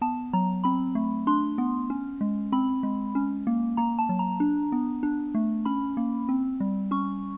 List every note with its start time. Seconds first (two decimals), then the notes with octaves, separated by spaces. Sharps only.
0.01 B3 A5
0.33 F#3 A#5
0.64 C4 B5
0.95 A3
1.27 D4 C6
1.58 B3
1.90 C#4
2.21 G#3
2.52 C4 B5
2.83 G#3
3.15 C#4
3.47 A#3
3.77 A#3 A#5
3.99 A5
4.09 F#3
4.19 A#5
4.40 D4
4.72 B3
5.03 D4
5.35 A3
5.65 C#4 B5
5.97 A#3
6.29 C4
6.60 G3
6.91 C#4 C#6